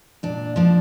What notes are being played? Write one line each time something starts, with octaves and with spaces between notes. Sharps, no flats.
A#2 D4
F3 A#3 D4